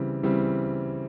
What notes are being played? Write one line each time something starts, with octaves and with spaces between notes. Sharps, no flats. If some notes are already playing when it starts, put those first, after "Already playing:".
Already playing: C#3 E3 G3 C4
C#3 E3 G3 C4